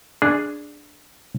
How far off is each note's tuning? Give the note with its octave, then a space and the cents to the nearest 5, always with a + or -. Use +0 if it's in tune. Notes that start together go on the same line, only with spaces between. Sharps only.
D4 +0 G#4 +0